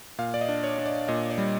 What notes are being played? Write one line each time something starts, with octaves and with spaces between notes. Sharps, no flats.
A#2 F5
D5
D#5
D4
C#5
D4
D5
A#2 D#5
D5
G3